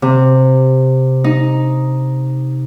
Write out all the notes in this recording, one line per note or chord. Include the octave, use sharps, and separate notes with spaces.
C3
D#4